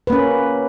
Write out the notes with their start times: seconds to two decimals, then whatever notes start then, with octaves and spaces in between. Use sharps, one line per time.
0.07 B4
0.10 A#3
0.12 C#4